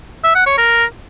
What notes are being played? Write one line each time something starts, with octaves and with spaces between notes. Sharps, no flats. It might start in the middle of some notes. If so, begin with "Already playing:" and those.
E5
F#5
C#5
A#4